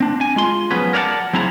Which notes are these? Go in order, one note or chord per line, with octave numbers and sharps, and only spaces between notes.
C4 D4
G#5
G#3 F4 C6
F3 F#3 B3 C#4 G#4 B4
A#4 C#5 D5 F5 F#5 A5
F#3 C4 E4 G#4 A#5